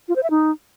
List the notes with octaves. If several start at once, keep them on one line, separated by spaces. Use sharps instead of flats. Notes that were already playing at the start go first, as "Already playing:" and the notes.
F4
C5
E5
D#4